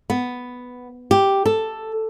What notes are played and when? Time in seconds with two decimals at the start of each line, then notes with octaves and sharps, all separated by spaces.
0.10 B3
1.11 G4
1.46 A4